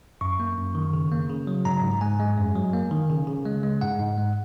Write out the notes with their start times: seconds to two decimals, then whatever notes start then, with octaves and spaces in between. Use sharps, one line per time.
0.21 F#2 C#6
0.40 A#3
0.58 F#2
0.75 D#3
0.93 C#3
1.12 A#3
1.30 C#3
1.47 F#3
1.65 G#2 A#5
1.83 G#2
2.01 G#3 G#5
2.20 G#3
2.38 F#2
2.56 F#3
2.73 A#3
2.91 D#3
3.10 C#3
3.27 C#3
3.46 G#3
3.63 G#3
3.81 G#2 F#5
3.99 G#2
4.18 G#3